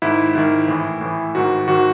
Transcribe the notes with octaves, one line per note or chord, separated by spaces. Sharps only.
G#2 D#3 E4
G#2 D#3 E4
A2 E3
A2 E3
G#2 D#3 F#4
G#2 D#3 F#4